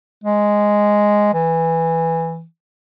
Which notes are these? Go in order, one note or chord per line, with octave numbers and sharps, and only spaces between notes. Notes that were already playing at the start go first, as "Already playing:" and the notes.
G#3
E3